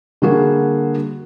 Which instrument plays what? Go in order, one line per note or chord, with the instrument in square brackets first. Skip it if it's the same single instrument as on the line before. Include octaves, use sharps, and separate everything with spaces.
[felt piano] D3 G3 A#3 F#4 G#4